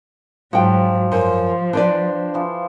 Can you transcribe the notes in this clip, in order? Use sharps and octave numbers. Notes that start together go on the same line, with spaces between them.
G#2 F3 F#3 F#4 G4 G5
F#2 F3 C5
D4 B4 D5 G5 C6
E3 F3